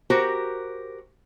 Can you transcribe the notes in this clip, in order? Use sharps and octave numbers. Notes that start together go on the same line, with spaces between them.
F#4 G4 A#4 C5